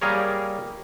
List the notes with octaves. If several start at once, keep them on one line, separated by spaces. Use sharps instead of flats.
G3 A#3 G#4 A#4 C#5